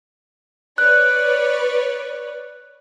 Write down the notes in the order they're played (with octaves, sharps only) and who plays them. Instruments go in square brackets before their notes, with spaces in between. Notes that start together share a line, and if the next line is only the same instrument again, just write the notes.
[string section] B4 C#5 D5 [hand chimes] F#6